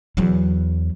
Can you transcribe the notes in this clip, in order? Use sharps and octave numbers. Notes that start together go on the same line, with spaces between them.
E2 F#3